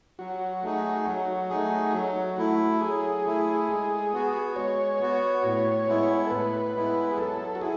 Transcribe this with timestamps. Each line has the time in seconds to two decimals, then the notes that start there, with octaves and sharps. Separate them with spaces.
0.19 F#3 F#4
0.62 A3 D#4 G#4
1.07 F#3
1.50 A3 D#4 G#4
1.94 F#3
2.38 A3 E4
2.81 F#3 G#4
3.25 A3 E4
3.69 G#3
4.13 B3 F#4
4.56 G#3 C#5
5.00 B3 F#4
5.44 A2
5.87 G#3 B3 E4
6.26 A4
6.30 A2 B4
6.75 G#3 B3 E4
7.11 G#4
7.18 F#3 A4
7.55 F#4
7.61 E4 G#4